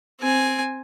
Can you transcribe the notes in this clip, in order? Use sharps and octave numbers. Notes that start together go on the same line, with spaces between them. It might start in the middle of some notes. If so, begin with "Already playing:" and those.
C4 G#5